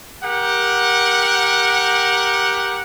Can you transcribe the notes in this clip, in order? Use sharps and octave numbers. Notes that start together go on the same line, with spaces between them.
G4 A#4 F#5